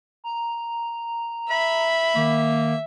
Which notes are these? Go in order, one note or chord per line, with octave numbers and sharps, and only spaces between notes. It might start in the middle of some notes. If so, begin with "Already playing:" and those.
A#5
E5 B5
D#3 A#3